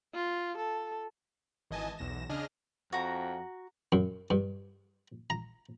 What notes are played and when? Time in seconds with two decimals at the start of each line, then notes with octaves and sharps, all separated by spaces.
0.14 F4
0.57 A4
1.70 G#1 E3 D#5 G#5 A5
1.98 B1 E2 A#6 E7
2.29 C#3 D4 G#4 D#5 F6 A#6
2.93 F2 F#4 A#5
3.92 F#2
4.30 G2
5.30 A#5